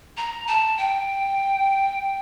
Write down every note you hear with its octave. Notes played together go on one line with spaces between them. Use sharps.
A#5
A5
G5